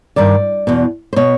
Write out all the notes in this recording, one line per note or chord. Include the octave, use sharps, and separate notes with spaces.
G2 D#3 D5
E2 B2
C5
B2 C#5